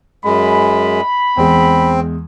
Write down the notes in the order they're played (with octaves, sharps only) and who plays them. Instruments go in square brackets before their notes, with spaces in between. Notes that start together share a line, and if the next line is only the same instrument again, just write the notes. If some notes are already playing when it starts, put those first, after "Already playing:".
[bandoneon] F#2 G#3 [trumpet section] B5
[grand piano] E2 G#3 [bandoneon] C4